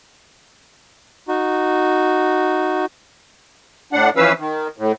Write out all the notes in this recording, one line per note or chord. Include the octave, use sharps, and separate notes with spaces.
D#4 F#4
A2 D4 F#5
E3 F3 C#4 B4 F5 E6
D#3
A2